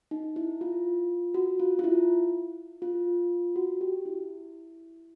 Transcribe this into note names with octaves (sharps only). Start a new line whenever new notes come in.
D#4
E4
F4
F#4
F4
F4
E4
F4
F#4
G4
E4